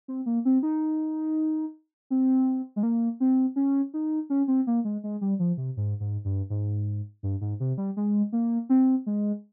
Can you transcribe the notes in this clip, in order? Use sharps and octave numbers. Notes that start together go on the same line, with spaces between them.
C4
A#3
C4
D#4
C4
G#3
A#3
C4
C#4
D#4
C#4
C4
A#3
G#3
G#3
G3
F3
C3
G#2
G#2
G2
G#2
G2
G#2
C3
G3
G#3
A#3
C4
G#3